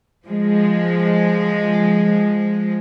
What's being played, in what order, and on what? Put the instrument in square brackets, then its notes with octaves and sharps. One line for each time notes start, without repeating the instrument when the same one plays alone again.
[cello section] F3 G#3